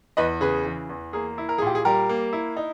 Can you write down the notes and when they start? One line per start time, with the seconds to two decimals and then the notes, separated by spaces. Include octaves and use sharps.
0.17 E2 B4 D#5
0.41 C#3 G#4 B4
0.65 E3
0.89 E2
1.13 A#3 G#4
1.38 E4
1.49 A#4
1.58 G#4
1.62 A#2 G4
1.75 G#4
1.85 G3 G4 A#4
2.09 A#3
2.33 E4
2.57 D#4